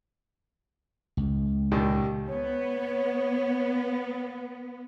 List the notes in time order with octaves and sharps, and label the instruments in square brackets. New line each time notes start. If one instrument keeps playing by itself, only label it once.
[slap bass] C#2
[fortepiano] D#2 A#2 D#3
[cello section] B3 [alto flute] C#5